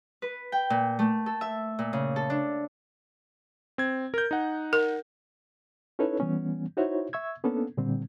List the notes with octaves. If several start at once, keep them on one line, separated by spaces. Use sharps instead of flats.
B4
G5
A#2
A3
A4
E5
A#2
C#3
A4
D4
C4 G#6
A#4 G6
D#4 F#5
A#4
C#4 D#4 E4 A4 B4 C#5
E3 G3 B3 C#4
D#4 E4 F#4 C5 C#5 E5
E5 C#6 E6 G#6
A#3 B3 C#4 D4 A4
A#2 D3 G3 C4